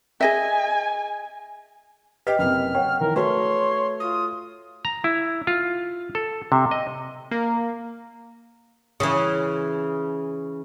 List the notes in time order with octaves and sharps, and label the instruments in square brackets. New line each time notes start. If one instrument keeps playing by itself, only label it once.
[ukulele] G#4 D#5 E5 [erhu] G#5
[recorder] G4 [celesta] B4 D#5 G5 [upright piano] F6 B6
[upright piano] F#1 C3 [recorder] F6
[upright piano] C#5 F#5 [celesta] G5
[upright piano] D#3 E3 [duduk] A#4
[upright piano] A3 [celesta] F#4 B4 [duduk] C#5 [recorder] C6
[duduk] F4 [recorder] D#6
[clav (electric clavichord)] A#5
E4
F4
A4
C3
D#5
[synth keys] A#3
[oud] C#3 E3